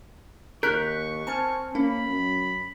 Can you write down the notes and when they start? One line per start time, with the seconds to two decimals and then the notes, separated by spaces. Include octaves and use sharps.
0.63 D#2 A#4 C#6 F#6 G6 B6
1.27 C4 G#5 A5 F6
1.75 A#3 C#4 B5
2.09 F#2